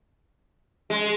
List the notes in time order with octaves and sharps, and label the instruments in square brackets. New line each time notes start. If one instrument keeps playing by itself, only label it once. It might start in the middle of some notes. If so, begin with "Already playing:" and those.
[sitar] G#3